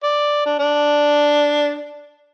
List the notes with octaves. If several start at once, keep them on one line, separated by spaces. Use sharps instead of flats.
D5
D4
D4